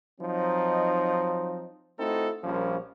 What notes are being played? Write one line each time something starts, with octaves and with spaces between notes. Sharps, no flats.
F3 F#3 C4 D#4
A3 C4 D#4 E4 F#4 A4
A#1 F3 G3 A#3 C#4